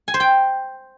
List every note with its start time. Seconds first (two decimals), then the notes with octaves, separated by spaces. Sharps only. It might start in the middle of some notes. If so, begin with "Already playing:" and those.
0.08 G#5
0.14 C5
0.20 G5